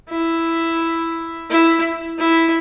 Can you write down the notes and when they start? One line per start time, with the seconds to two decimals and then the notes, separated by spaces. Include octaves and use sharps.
0.10 E4
1.50 E4
2.19 E4